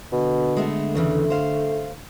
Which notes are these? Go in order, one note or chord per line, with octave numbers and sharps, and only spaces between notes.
B2 D3
G#3 A3 B3
E2 C#3 E3 A3
C5 F5